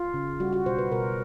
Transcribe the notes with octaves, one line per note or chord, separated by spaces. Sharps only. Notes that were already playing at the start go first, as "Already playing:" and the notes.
Already playing: F4
C#3
G3 F#4
F#4
B2 C5
B4
B2 A#4